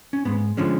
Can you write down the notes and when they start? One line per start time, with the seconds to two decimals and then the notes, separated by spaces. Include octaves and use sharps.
0.13 C#4
0.25 G#2 G#3 B3
0.57 D3 F3 G#3 C#4